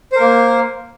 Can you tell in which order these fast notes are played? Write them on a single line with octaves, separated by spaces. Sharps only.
C5 A#4 A#3